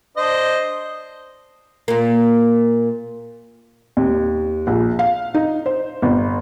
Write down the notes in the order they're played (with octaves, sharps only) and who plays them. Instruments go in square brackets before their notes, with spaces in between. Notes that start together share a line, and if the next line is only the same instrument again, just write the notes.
[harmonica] D4 C5 D#5
[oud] A#2 A#3
[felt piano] D#2
A#1
F5
D#4
C5
G1